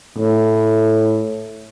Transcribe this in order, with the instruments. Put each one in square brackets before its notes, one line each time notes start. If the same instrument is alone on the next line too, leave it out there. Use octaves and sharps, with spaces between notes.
[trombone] A2